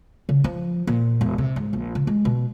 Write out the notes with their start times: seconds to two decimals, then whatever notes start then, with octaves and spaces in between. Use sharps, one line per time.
0.29 C#3
0.44 F3
0.87 A#2
1.21 E1
1.38 C3
1.56 G#2
1.73 A#1
1.95 C#3
2.07 G#3
2.25 B2